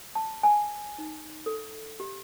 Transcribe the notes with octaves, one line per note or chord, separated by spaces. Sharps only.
A5
G#5
D#4
A4
G4